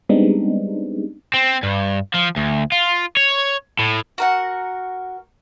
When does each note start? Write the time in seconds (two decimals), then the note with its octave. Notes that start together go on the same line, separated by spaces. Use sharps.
0.09 G3 G#3 B3 C4 D4 D#4
1.34 C4
1.63 G2
2.14 F3
2.37 D2
2.72 F4
3.17 C#5
3.79 A2
4.18 F#4 A#4 F#5